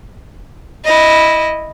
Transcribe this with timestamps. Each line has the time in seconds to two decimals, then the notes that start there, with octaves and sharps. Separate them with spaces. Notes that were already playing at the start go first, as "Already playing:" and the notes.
0.84 E4 D#5